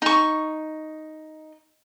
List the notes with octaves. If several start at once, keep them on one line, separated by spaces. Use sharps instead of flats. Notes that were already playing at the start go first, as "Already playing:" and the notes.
D#4 C#6